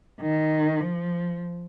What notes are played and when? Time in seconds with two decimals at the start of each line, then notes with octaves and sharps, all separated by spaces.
0.21 D#3
0.80 F3